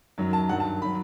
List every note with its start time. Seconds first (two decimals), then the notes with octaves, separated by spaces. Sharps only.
0.18 F#2 D#3 F#3
0.33 A5
0.49 G2 D#3 F#3 F#5
0.60 A5
0.82 D#3 F#3 B5